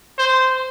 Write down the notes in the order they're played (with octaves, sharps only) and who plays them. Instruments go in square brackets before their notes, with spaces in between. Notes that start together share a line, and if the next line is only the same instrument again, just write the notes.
[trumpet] C5